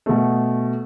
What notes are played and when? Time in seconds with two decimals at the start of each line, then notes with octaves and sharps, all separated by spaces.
0.06 B2 A3